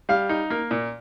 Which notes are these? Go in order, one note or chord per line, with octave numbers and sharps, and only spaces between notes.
G3 F5
D#4
A#3
A#2